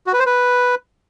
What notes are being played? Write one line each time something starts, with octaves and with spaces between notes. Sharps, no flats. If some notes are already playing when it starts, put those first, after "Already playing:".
F#4
B4
C5
B4